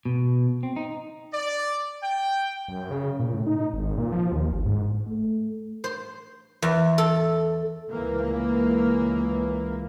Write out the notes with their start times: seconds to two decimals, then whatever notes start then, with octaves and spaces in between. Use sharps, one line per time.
0.05 B2
0.63 C4
0.76 D#4
1.34 D5
2.03 G5
2.68 F#2
2.91 C#3
3.19 A#2
3.34 A2
3.47 D#4
3.73 G#1
3.97 A#2
4.12 F3
4.32 D#2
4.51 G1
4.66 G#2
5.08 A3
5.84 C5
6.62 E2
6.98 A4
7.90 C#2 E3 A#3